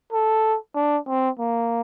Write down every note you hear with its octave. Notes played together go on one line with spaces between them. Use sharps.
A4
D4
C4
A#3